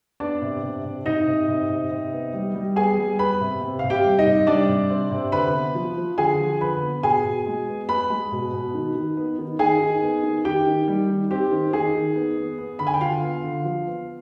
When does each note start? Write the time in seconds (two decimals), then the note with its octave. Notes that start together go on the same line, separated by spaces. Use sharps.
0.20 B3 D4 D5
0.42 C3
0.63 C3
0.84 C3
1.06 C3 D#4 D#5
1.27 C3
1.48 C3
1.69 C3
1.91 C3
2.12 B3
2.34 G3
2.54 G3
2.76 B3 G#4 G#5
2.98 G3
3.19 B3 B4 B5
3.41 C3
3.61 C3
3.79 C3 F5
3.90 G4 G5
4.04 G3
4.19 D#4 D#5
4.26 C3
4.47 G3 D4 D5
4.69 C3
4.90 C4
5.11 C3
5.32 D3 B4 B5
5.54 B3
5.75 F3
5.97 F3
6.18 D3 G#4 G#5
6.40 F3
6.61 D3 B4 B5
6.82 B3
7.03 B2 G#4 G#5
7.25 B2
7.46 G#3
7.68 B3
7.89 G#3 B4 B5
8.10 G#3
8.32 B2
8.53 B2
8.74 D#3
8.95 D#3
9.17 B3
9.39 D#3
9.59 D#3 G#4 G#5
9.81 D#3
10.02 B3
10.23 D#3
10.45 D#3 G4 G5
10.67 D#3
10.88 G3
11.09 D#3
11.30 C4 G4
11.52 D#3
11.73 D#3 G#4
11.94 D#3
12.16 B3
12.38 B3
12.58 B3
12.79 D3 B5
12.87 G#5
12.94 G5
13.01 D3 F4 F5
13.22 B3
13.44 D3
13.65 F3
13.87 B3